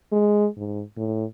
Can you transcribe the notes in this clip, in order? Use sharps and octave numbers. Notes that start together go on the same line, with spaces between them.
G#3
G#2
A2